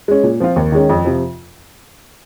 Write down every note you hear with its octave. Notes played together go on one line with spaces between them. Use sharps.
G#3 C#4
A#2
F3 C4 F4
D#2
D#3 G#3 C#4
F2
C3 F3